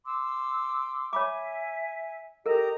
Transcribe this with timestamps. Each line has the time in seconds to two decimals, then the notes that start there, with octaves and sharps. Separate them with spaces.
0.05 C6 D6 E6
1.13 C#5 E5 G#5 B5 D6
2.46 G4 A4 A#4 D#5 A#5